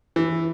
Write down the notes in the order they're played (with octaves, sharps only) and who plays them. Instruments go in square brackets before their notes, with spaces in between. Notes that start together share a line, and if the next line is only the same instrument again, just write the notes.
[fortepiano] E3